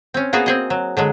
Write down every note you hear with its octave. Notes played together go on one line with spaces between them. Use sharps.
C4 C#4
A#3 B3 F#4 G#4 F5
C4 G#4 D#5
F#3
D3 F#3 G#3